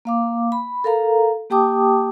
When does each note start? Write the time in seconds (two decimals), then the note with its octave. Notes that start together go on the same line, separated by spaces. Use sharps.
0.05 A#3 F5 D6
0.52 B5
0.84 A4 A#4 F5 A#5
1.50 A#3 G4 G5 A5 D6 D#6